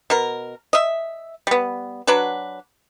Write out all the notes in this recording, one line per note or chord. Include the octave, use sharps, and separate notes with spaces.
B2 A#4
D#5 E5
G3 B3
F#3 D4 F#4 B4